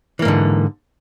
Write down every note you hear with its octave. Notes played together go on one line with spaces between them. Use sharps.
G#2 D3 E3 A#3